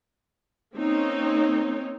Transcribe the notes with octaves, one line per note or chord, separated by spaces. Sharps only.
A#3 C4 C#4 D#4 C#5